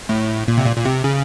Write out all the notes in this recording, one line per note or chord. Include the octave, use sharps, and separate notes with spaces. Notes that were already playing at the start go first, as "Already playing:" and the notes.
A2
A#2
C3
A#2
A#2
C3
C#3